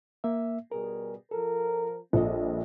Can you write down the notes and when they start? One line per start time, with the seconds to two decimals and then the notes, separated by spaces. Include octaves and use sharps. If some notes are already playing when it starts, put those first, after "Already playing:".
0.24 A#3 E5
0.72 B2 G3 G#4 A#4
1.31 F3 A4 A#4
2.13 A#1 G3 A#3 C4 F4 A4 D#5